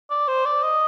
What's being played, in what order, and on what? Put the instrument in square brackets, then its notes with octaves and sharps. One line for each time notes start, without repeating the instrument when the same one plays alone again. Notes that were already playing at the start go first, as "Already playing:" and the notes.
[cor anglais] D5
C5
D5
D#5